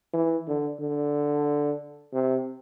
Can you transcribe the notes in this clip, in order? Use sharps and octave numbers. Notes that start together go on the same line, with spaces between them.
E3
D3
D3
C3